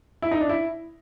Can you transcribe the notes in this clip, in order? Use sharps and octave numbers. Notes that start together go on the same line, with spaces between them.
E4
D#4
D4
E4